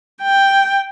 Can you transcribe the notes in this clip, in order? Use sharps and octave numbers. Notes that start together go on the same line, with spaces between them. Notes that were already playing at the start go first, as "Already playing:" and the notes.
G5